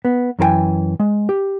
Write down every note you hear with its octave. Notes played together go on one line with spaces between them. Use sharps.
B3
F#2 E3 A#4 G5 G#5
G#3
G4